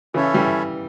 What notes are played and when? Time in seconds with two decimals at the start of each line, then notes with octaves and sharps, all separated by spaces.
0.14 C#3 E3 C#4 E4 A4 C#5 E5
0.34 E3 G3